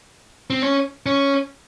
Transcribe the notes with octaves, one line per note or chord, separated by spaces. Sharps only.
C4
C#4
C#4